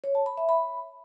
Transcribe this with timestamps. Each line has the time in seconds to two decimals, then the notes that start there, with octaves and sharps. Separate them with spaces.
0.04 C#5
0.15 A5
0.26 B5
0.37 E5
0.49 B5